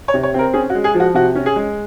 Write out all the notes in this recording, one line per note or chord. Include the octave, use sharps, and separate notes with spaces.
C#5
C3
C#5
C4 A#4
C#4 G#4
F#4
G#3
G#4
F3
F#4
C3 F#4
C#4
G#4
G#3